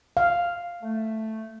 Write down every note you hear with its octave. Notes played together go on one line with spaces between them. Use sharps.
F5
A3